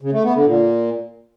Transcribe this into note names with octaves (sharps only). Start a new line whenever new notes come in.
C#3
A3
B3
D3
A#2